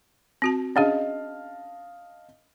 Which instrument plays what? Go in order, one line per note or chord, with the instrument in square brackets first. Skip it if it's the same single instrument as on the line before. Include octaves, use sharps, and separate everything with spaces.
[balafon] C4 F#4 A5
[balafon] C#4 D4 G#4 [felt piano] D#5 F5 A5